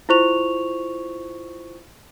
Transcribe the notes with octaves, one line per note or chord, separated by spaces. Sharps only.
E4 F4 C5 C#6 F7